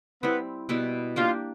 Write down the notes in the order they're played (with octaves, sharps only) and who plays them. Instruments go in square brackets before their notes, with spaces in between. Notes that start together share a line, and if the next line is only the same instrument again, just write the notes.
[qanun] G3 C4 E4 [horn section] B3
[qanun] B2 G3 B3 E4
[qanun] A#3 D4 G4 [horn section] F4